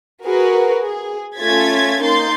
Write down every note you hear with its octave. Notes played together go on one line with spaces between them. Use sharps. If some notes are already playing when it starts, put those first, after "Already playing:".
F#4 G#4 A#4 B4
G#4
A3 C#4 F4 G#6 A6 B6
A#3 D#4 C6 G6 A6